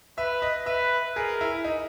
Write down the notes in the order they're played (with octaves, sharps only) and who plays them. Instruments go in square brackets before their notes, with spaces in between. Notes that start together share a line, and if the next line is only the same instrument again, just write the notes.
[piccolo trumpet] B4 [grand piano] E5
[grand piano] D#5
[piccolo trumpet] B4 [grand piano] E5
[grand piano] G#4 [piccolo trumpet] A#4
[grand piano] E4
D#4